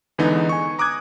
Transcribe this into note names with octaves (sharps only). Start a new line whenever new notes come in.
E2 D3 E3 G#3 B3 D#4
G#5 C#6
A#5 D6 D#6 F#6 G#6